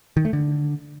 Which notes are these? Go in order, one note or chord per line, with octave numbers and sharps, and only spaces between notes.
D#3
A3
D3